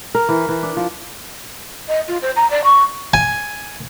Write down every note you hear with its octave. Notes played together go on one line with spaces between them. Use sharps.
A#4
E3
E3
D4
F3
D#5
F4
C5
A#5
D5
C#6
G#5